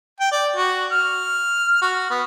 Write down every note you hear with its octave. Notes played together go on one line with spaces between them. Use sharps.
G5
D5
F#4
F6
F#4
B3